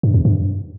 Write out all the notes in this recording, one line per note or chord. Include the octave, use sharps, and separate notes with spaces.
G2
E2
G2